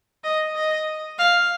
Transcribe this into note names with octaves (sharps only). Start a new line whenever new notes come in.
D#5
D#5
F5